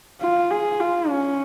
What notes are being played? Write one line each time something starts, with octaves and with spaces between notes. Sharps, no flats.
F4
G#4
F4
C#4